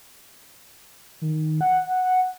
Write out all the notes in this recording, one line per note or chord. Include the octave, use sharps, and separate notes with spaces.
D#3
F#5